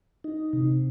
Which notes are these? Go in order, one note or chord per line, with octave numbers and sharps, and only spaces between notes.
D#4
C3